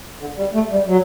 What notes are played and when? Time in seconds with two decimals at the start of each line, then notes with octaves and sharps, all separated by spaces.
0.20 D3
0.37 G3
0.54 A3
0.71 G3
0.87 F#3